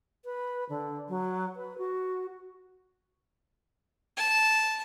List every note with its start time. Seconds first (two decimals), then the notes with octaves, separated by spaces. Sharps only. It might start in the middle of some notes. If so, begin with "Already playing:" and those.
0.25 B4
0.69 D3
1.09 F#3
1.56 B4
1.78 F#4
4.17 A5